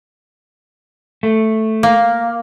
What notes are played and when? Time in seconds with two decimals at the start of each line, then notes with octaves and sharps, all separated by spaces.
1.23 A3
1.83 A#3